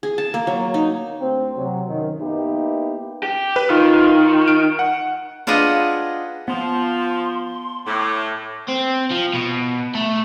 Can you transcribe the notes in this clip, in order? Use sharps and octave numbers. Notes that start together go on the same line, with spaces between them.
G#4
A5
A#3
F#3
D#4
D2 C4
C3 F#3
F#2 C3 D#3
A#3 B3 D#4 E4 G4
G4
B4
D#3 F4
D7
F#5
D4 F4 G#4 B4 D#5 F#5
F3 B3 C6
A2 D6
C4
F3
B2
A3